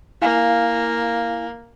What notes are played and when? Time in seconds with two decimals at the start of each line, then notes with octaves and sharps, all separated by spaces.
0.22 A#3 E4 F5 G#5